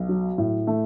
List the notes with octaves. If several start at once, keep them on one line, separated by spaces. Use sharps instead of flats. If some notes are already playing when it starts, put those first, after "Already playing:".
Already playing: B1
F#3
A2
A3